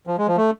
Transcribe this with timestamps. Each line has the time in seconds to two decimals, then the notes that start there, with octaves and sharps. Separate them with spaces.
0.07 F3
0.18 G#3
0.27 F3
0.37 A3